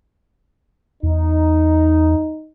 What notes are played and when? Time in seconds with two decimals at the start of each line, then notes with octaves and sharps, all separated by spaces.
1.03 E2 D#4